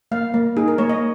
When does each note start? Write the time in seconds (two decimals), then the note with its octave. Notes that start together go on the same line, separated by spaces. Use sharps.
0.12 A#3 F5
0.34 A#3
0.57 D#4 G#4
0.68 A#4
0.78 A#3 C#5
0.89 D#5